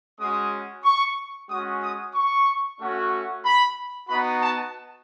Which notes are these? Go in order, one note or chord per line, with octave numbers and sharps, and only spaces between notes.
G#3 C#4 F#4 D#6
C#6
G#3 C#4 F#4 D#6
D#6
C#6
A3 C#4 F#4
B5
B3 D#4 F#4 B5
A5